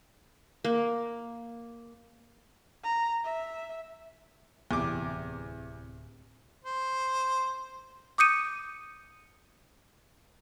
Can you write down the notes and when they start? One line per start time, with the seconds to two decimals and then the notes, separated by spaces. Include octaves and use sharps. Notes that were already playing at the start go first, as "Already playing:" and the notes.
0.64 A#3
2.84 A#5
3.24 E5
4.71 D1 E2 C3 D6
6.64 C5
8.18 D6 D#6 G6 C#7 D#7